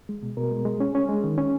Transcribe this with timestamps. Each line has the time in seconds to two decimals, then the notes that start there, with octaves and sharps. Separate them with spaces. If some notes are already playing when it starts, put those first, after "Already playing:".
0.09 G#3
0.23 B2
0.37 B2 A#4
0.51 G#3
0.65 G#3
0.80 C#4
0.95 C#4
1.09 G#3
1.24 D#3
1.38 C#4